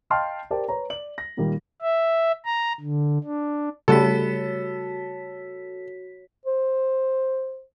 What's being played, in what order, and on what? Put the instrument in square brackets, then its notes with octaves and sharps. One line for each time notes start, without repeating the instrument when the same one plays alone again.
[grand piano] D#5 F5 G5 A5 C6 F6
G4 A#4 C5 D5 G5 A5
B4 C#5 A#5
D5 F#7
A#6
A#2 D#3 G3 A#3
[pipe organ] E5
A#5
D3
D4
[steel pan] C#3 G3 A3 [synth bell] F#4 C#5 B6 [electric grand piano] A4
[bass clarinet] C5